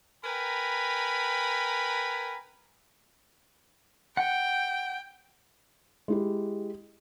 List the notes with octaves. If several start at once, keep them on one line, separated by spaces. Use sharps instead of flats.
A#4 B4 G5 G#5 A#5 B5
F#5 G5
G#3 E4 G4